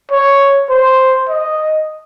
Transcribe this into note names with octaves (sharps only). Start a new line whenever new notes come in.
C#5
C5
D#5